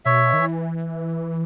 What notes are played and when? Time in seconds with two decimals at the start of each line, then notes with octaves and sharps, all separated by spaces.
0.05 B2 C#5 E5
0.33 D#3
0.39 E3